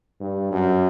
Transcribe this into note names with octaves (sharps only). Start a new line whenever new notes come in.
G2
F#2